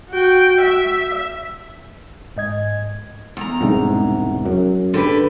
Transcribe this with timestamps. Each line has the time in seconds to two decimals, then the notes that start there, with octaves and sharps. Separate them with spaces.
0.11 F#4 G5
0.61 E5
2.36 G#2 D#5 G#6
3.37 E2 A#5
3.61 E1 C2 G#2
4.45 F#2
4.94 D3 G4 B4